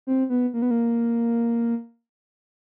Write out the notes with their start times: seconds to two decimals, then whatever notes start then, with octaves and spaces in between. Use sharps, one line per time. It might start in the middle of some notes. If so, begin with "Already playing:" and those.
0.07 C4
0.30 B3
0.54 A#3
0.62 B3
0.71 A#3